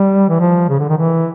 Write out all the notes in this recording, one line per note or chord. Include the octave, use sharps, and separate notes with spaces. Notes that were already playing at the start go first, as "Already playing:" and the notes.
Already playing: G3
E3
F3
C#3
D3
D#3
E3